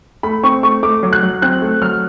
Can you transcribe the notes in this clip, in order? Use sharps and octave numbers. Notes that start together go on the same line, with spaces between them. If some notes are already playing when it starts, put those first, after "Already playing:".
A3 B5
C4 C#6
A3 C#6
A3 D6
F#3
F#6
F#3
C4 F#6
A3
F#3 F6